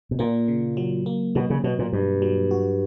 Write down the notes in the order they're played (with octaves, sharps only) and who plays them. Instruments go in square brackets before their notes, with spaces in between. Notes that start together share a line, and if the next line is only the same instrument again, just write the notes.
[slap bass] B2
[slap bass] A#2 [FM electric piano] A#3
[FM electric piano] C#3
F#3
A#3
[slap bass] B2 [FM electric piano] F#3
[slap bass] C#3
[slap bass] B2 [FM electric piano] F#3
[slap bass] A#2
[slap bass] G2 [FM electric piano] B2
[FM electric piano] F#3
F#4